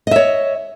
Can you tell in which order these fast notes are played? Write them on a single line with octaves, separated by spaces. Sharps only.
D#5 E5 C#5